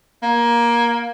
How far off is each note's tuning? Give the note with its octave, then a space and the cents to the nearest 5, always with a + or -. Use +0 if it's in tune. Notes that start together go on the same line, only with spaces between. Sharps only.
A#3 +15